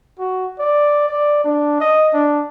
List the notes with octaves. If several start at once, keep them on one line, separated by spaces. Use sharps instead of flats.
F#4
D5
D5
D4
D#5
D4